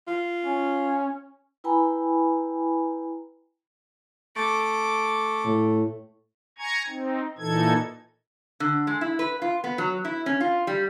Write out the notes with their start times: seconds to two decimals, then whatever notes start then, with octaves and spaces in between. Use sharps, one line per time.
0.07 F4
0.45 C#4
1.64 E4 B4 G5 G#5 A#5 B5
4.36 A3 D6
5.45 A2
6.58 G#5 A#5 C#6 G#6
6.88 C4 D#4
7.38 A#2 E3 D#4 A4 G#6
8.60 D3
8.87 G#3
9.01 E4
9.19 B4
9.42 F4
9.64 B3
9.78 F#3
10.05 E4
10.26 C#4
10.41 F4
10.67 G3